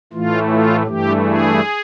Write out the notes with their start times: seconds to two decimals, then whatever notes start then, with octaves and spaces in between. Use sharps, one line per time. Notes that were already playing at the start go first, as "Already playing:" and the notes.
0.13 A2 E3 A3 F4
0.50 F4
0.87 G2 E3 A3 G4
1.24 G#4